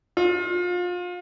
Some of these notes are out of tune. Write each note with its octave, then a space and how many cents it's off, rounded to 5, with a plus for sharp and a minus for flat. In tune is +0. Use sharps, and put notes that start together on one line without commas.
F4 +30